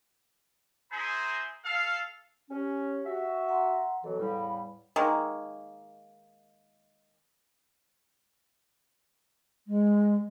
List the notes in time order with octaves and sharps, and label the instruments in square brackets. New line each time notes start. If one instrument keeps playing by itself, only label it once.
[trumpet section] E4 G#4 C5 G#5 A#5 C6
A4 F5
[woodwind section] C#4 [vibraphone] G4
[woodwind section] F#4 E5
[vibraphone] F#5 A#5 C6
[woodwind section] B2 E3 F#3 [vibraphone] A4
[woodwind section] E2 A2 G3 [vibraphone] F5 B5
[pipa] D#3 G#3 A#3
[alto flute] G#3